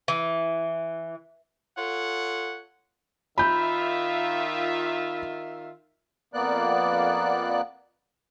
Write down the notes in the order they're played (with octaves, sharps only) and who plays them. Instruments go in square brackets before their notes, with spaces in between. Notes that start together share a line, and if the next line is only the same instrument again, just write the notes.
[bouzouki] E3
[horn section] F4 A4 C#5 F#5
[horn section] D#3 F4 E5 [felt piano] B5 G6
[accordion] F2 A#3 B3 D5 F#6